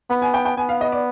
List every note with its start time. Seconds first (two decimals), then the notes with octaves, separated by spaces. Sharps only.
0.10 B3 B5
0.22 G#5
0.34 G5
0.45 G5
0.57 B3 G#5
0.69 F5
0.81 D#5
0.92 D5